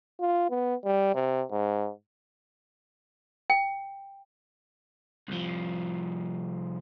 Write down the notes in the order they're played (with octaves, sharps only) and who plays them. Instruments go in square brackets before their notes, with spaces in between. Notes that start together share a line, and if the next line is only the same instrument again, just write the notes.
[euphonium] F4
B3
G3
C3
G#2
[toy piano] G5
[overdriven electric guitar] C2 F3